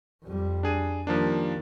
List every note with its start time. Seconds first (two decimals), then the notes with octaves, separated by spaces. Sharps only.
0.24 F2 G3
0.63 D4 G#4 D#7
1.07 D#3 F3 G3 A#3 D4